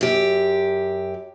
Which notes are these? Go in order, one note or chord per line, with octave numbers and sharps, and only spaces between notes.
F#2 G4